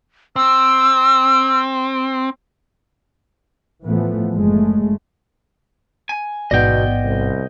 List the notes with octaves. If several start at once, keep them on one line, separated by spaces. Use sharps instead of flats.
C4 E6
A2 E3 F3 A3 B3
F#1 G#3 A3
G#5
A1 G#2 B2 B3 D5 D#5 G5
C2